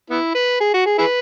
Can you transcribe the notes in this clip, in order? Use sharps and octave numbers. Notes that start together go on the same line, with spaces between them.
B3 E4
B4
G#4
F#4
G#4
E4 G#4 B4